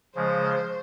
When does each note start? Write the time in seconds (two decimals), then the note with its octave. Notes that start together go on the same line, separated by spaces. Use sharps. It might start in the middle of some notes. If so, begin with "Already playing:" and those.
0.16 C#3 F3 G#3 C5